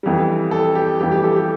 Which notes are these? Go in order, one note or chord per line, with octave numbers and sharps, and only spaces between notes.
F2 E3 G3
A4
G4
F2 E3 G3 G4
G4
A4
G4